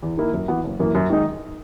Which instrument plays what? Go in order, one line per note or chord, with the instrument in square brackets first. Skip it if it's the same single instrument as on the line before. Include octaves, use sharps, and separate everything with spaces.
[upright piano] E2
D#3 A#3 E4
F#2
E3 B3 F#4
F#1
F#2 E3 A#3
F#2
D#3 G#3 D#4